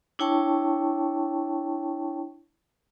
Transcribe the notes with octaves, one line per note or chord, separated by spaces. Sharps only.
D4 E4 C#5 G5 A5 C#6